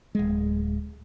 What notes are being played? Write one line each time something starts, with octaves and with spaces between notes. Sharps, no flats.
D1 G#3